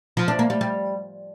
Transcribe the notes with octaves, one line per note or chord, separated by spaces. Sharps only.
F3
D4
A#3
G3
G3